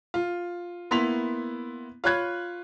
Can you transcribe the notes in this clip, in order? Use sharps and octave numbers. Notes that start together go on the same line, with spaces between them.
F4
A#3 B3 E4 C6 B6 F7
F4 C#5 B5 F#6 G#6